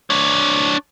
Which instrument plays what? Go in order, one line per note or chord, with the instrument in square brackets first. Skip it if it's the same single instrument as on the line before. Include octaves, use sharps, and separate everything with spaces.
[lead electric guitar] D4 C#5